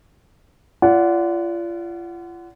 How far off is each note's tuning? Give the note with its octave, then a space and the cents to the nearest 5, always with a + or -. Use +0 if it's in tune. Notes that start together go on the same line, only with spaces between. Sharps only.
F4 -35 D5 -30 F#5 +0